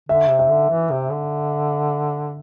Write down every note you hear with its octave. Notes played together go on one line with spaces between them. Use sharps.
D3 E5
C3
E5
D3
E3
C3
D3